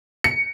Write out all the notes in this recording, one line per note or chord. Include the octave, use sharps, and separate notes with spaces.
C#7